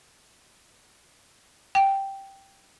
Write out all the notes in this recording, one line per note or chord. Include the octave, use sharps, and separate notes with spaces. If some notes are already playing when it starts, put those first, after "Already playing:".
G5